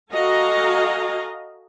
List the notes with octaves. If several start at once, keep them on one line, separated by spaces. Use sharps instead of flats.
F#4 A4 D#5 F5 G#5 A#5